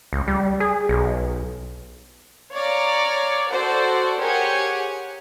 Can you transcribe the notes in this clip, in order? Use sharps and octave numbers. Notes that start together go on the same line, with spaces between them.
C#2
G3
G#4
B1
C#5 D5 F5 A#5
F#4 A4 C5 D5
G4 G#4 A#4 C#5 F#5 G#5